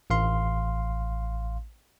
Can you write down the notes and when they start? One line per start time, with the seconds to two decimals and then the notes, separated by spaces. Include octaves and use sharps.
0.10 A1 F5 C6